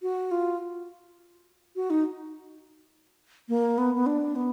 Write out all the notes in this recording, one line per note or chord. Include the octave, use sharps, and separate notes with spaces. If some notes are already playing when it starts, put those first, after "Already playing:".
F#4
F4
F#4
D#4
A#3
B3
B3
D4
B3